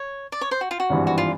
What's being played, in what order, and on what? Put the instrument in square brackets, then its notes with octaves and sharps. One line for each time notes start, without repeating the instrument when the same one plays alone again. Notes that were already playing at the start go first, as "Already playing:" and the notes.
Already playing: [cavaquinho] C#5
D5
C#5
C5
F#4
F4
F#4
[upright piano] G#1 G2 E3
[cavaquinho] F#4
F4